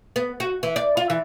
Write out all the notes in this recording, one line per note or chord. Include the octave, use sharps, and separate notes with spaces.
B3
F#4
E3
D5
F4
E3